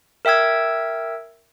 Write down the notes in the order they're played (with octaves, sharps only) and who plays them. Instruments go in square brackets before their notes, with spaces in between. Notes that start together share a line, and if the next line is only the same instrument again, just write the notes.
[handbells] A#4 E5 G5 E6 G#6